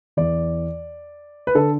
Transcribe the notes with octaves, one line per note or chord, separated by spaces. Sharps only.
E2 E3 D5
B4
D3 A4